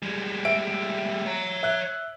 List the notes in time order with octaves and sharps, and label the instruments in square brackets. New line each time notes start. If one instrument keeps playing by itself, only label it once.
[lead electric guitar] G3 G#3
[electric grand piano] E5 D7
[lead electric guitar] C#5 A#5
[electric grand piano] E5 F#6